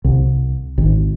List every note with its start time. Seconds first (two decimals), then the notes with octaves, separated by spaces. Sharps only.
0.04 C2
0.78 G#1